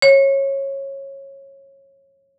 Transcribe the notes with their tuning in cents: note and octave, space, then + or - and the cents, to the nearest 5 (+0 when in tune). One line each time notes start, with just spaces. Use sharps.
C#5 -20